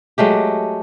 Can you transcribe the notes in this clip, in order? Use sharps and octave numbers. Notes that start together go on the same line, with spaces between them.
F#3 G#3 A3 G4